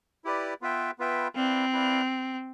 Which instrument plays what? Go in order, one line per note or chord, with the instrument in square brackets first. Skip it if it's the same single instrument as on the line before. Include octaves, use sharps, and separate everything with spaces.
[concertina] E4 G4 B4 D5
B3 F4 B4 E5 G5
B3 F4 B4 E5 G5
[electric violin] C4 [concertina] E4 B4 D5 F5
[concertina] E4 B4 D5 F5